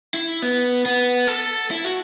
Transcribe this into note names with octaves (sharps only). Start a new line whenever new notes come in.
E4
B3
B3
A4
E4
F#4